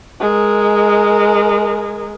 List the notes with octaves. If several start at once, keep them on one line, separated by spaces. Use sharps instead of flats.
G#3 A#4